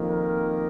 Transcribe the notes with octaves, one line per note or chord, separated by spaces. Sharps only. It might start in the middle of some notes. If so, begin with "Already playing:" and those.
Already playing: F2 D#3 A#3
A#4